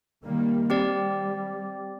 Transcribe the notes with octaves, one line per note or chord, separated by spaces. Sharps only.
D#3 G3 A#3
G3 C4 G4 D5